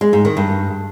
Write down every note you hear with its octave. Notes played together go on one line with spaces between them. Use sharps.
G#3
G#2
D#3
G2